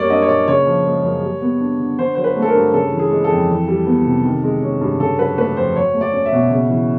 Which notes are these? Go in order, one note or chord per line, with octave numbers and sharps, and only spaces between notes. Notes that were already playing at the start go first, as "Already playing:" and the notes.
Already playing: F#2 G3 A#3 C#5 D5
D4 D#5
C#5
A#2 D5
C#3 C#5
F3
G#3
F#2
G3
B3
D4
D3
D3 C5
F#3 C5
B4
A3
A4
A#4
G2
C#3 A4
E3
G#4
G#3
A4
F2
E3
G3
B3
C3
D#3
G#3
C#4
G2
C#3 A4
F#3 B4
A3 B4
F2 C5
F#3 C#5
A3
D5
C#4
E5
B2
C#3
E3